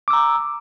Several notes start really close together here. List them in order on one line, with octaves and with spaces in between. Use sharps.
D6 E6 A#5